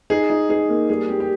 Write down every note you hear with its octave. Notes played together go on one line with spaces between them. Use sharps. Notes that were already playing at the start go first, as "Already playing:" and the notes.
D#4 G#4
D#4
D#4 G#4
A#3
G3 G#4
A#3 G4
G4